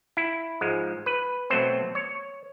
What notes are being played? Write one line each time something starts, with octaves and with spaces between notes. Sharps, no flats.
E4
G#2 F3 G#3
B4
B2 F#3 A3 C4 C5
C#5